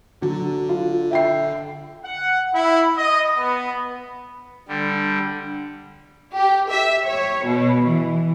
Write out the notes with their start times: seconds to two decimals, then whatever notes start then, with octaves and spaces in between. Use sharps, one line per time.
0.22 D3 F#3
0.69 F4
1.11 E5 G5 C7
2.04 F#5
2.53 E4
2.97 D#5
3.37 B3
4.68 D3 G3
6.33 G4
6.68 E5
7.07 C#5
7.44 B2
7.87 E3